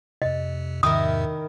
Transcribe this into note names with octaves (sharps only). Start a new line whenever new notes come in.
F2 C3 D#5
E2 G#2 C3 D#3 E4 A#4 D#6